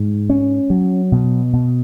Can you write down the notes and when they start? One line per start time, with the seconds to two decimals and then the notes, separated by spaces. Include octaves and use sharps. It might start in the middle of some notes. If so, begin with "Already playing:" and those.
Already playing: G#2
0.30 C#4
0.70 F#3
1.12 B2
1.53 B2